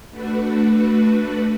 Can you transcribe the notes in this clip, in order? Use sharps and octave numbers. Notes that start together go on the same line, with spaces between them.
A3 D4 F#4 B4